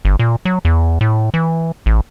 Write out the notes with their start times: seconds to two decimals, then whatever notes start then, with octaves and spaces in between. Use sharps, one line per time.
0.05 G1
0.19 A#2
0.45 F#3
0.65 E2
1.01 A2
1.34 E3
1.86 A1